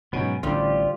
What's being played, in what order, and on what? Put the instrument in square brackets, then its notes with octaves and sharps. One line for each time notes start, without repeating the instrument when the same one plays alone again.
[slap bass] G#2 B2 [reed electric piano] F#3 D#4 [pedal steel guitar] B3 C#4
[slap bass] A1 [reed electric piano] D3 [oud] G3 C4 [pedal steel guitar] F4 G4